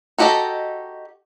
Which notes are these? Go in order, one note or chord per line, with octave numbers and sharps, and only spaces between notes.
D#4 F#4 G4 A4 D#5